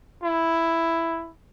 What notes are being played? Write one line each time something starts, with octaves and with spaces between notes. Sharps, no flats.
E4